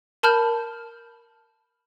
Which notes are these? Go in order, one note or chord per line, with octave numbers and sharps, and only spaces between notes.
A#4 A5 B5 F6 G6